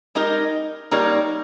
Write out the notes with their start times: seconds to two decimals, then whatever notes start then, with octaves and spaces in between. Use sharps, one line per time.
0.15 G#3 D#4 G4 A#4 D#5
0.91 G3 A#3 D#4 A#4 C#5